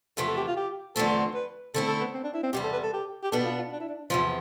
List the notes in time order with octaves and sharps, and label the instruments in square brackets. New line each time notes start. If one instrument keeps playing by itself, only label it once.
[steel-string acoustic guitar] E2 C3 F3 A3 [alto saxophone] A4
[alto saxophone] A4
G4
F4
G4
[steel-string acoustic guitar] E2 D3 F3 A3 C4 [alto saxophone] A4
[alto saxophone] B4
[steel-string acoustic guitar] D3 A3 C4 E4 [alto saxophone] A4
[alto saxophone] A4
B3
C4
D4
E4
C4
[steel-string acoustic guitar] E2 C3 G3 [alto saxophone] G4
[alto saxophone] A4
B4
A4
G4
G4
[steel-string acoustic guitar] B2 B3 D4 [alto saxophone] A4
[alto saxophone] F4
F4
D4
E4
D4
[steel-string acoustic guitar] E2 C3 F3 [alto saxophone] F4